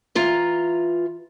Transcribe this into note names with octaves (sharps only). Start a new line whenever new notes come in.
E3 F4 A#5